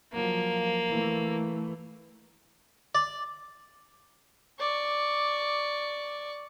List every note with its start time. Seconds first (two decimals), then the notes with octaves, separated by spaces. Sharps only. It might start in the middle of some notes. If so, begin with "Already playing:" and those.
0.13 F3 F#3 A#3
0.89 E3 A3
2.95 D5
4.59 D5 C#6